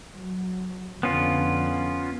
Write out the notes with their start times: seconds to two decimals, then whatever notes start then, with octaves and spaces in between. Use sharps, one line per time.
0.14 F#3
1.03 F2 D3 B3 C#4 F4